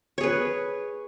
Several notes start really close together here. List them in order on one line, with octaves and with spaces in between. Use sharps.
C#5 G#4 B4